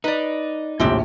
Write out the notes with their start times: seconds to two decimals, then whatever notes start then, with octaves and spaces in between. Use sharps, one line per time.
0.04 D#4 B4 D5
0.80 A#1 D#2 A2 G#3 C4 G4